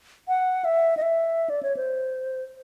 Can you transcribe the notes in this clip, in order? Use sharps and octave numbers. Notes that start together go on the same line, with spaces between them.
F#5
E5
D#5
E5
D5
C#5
C5